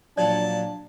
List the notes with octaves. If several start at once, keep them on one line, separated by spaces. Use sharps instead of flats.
A#2 F3 F#3 D4 D5 A5